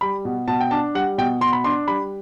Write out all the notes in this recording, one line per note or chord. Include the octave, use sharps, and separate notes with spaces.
G3 B5
B2
B2 A5
G5
D4 A5
G3 F#5
B2 G5
B2 C6
B5
D4 C6
G3 B5